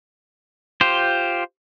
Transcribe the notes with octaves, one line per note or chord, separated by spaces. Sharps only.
F4 G4 C5